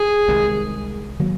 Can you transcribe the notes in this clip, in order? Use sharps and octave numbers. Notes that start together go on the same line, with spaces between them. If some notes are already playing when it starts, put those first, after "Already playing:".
Already playing: G#4
C2 C3 D#3 G#3
D#3 F#3 A#3